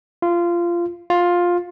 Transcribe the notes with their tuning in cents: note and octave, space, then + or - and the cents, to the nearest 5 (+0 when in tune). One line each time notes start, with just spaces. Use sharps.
F4 -20
F4 +10